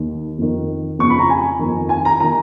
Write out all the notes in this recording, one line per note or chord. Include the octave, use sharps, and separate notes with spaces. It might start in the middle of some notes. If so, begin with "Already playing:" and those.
Already playing: D#2 D#3
F2 D#3
F2 C#3 C#6
B5
A#5
G#5
F2 D#3
G#5
A#5
D#3 A#5